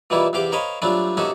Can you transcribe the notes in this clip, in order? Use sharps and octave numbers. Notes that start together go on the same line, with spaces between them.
B2 E3 G3 A#3 E4 F4
E2 C3 G4 F5 G5 D6
A#4 C5 C#5 D#5 F5 B5
F#3 G3 A3 C4 D4 F4
C3 A#3 C#4 D#4 F#4 A4